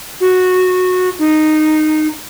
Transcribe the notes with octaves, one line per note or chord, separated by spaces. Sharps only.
F#4
D#4